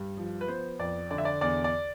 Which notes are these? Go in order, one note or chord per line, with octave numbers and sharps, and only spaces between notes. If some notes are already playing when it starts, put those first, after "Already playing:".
Already playing: G2
F3
B4
B3 C5
F2 D5
D3 D5
E5
D5
E2 D5
D5